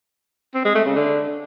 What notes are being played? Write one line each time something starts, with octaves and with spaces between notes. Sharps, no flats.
C4
G#3
A3
C#3
D3